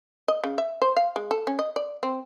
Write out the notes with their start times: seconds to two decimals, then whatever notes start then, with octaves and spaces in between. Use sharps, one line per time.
0.28 D#5
0.44 C#3
0.58 E5
0.82 C5
0.97 F5
1.16 G#3
1.31 A4
1.47 C#4
1.59 D#5
1.76 D5
2.03 C4